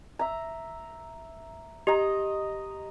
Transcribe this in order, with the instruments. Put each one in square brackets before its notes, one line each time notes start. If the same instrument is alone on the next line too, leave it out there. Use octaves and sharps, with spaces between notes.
[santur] E5 A#5
[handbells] G4 [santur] D#5 A#5